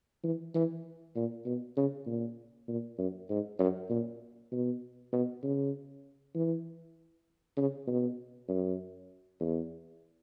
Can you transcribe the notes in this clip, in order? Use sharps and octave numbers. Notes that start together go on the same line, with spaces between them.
E3
E3
A#2
B2
C#3
A#2
A#2
F#2
G#2
F#2
A#2
B2
B2
C#3
E3
C#3
B2
F#2
E2